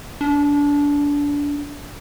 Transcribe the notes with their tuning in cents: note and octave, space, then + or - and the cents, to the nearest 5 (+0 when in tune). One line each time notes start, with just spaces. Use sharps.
D4 -25